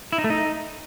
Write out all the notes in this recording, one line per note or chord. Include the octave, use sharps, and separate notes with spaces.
E4
D#4
A3
D#4